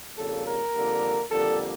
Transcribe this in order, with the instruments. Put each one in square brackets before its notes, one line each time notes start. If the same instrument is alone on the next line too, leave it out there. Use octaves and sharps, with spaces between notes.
[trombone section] F2 C#3 G3 A#3 A4
A#4
F2 D3 G3 A#3
F2 D3 G3 A#3 A4